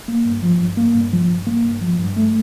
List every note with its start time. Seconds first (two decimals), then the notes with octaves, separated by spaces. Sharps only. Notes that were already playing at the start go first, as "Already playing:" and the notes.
0.08 A#3
0.25 G2
0.43 F3
0.60 G2
0.77 A#3
0.95 G2
1.13 F3
1.29 G2
1.47 A#3
1.64 G2
1.81 F3
1.99 G2
2.16 A3